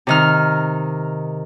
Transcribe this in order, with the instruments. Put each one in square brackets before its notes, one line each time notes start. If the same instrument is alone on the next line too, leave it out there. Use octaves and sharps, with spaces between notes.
[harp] C3 D#3 F6